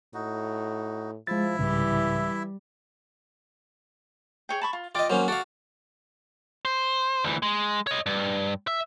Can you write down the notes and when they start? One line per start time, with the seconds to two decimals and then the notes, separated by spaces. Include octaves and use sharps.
0.14 A2 D#4 F#4
1.27 F3 G#3 E4 E5 A6
1.59 C2 G#2 C#3 E3 G3
4.49 G#4 C#5 G5
4.61 A5 B5 C#6
4.73 F4
4.95 F4 D5 D#5 G5 D6
5.10 F#3 A#3 C#4 C5 C#5 C6
5.28 F#4 A4 D5 F5
6.65 C5
7.24 D2 E3
7.43 G#3
7.87 C#5 D#5
8.06 G2
8.67 E5